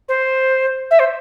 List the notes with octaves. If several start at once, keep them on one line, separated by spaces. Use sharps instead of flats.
C5
E5
C5